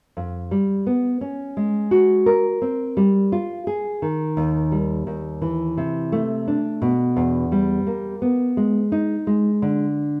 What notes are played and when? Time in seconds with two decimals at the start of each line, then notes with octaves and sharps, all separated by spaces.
0.17 F2
0.51 G3
0.87 B3
1.21 C#4
1.57 G#3
1.91 F#4
2.26 A#4
2.62 C4
2.97 G3
3.32 F4
3.67 G#4
4.02 D#3
4.37 D#2
4.72 G3
5.07 D#2
5.42 E3
5.77 C3
6.12 A3
6.48 D4
6.82 B2
7.16 E2
7.52 G3
7.87 A#3
8.22 B3
8.57 G#3
8.92 D#4
9.27 G#3
9.62 D3